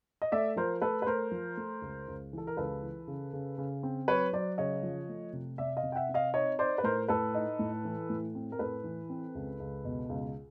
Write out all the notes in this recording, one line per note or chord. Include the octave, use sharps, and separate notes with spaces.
D#5
A3 D5 E5
F3 A#4 C5
A3 A4 B4
B4
A3 A#4 C5
F3
A3
C#2
C#2
E3 A4
A#4
C#2 A4 B4
E3
C#3
C#3
C#3
C4
F#3 B4 C#5
F#3 C5 D5
C#3 C#5 D#5
F3
A3
C3
C3 D5 E5
D#5 F5
C3
G5
E5 F#5
C4
D#5 F5
D#4 C#5 D#5
D#4 C5 D5
B4
A2 A#4 C5
A2 A4 B4
D#4
A2
E3
A2
C4
A#4
A2 A4 B4
E3
C4
C#2
C#2
B2
C#2